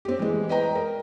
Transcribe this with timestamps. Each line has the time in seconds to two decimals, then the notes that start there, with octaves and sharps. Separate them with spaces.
0.05 C4 G4
0.19 E3 G#3
0.49 B4 D#5 G5 A#5
0.75 A#4